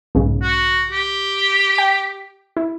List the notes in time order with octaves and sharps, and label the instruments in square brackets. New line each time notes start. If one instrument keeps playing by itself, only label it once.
[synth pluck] B1 G#2 C#3
[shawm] F#4
G4
[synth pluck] G5 D7
E4